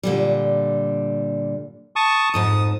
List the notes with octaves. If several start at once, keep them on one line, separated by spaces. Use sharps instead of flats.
A#2 D3 G3
A5 C#6 D#6
F2 G#2 A5 D#6